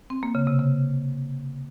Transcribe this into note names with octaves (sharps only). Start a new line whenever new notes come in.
C4
A#3
C#3
C3
C#3